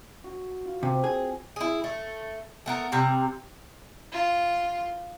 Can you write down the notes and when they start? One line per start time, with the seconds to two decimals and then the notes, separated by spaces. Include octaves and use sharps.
0.24 F#4
0.66 F4
0.83 C3 C4
1.04 G#4
1.56 E4 G#4
1.84 A3
2.66 A3 B3 A#4
2.92 C3 G3 A#5
4.12 F4